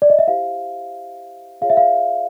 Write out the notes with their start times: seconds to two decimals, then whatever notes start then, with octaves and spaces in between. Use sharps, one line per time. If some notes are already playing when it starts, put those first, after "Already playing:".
0.02 D5
0.10 D#5
0.19 E5
0.27 E4 G4 C5 F5
1.61 F4 G#4 C#5 F5
1.70 E5
1.77 F5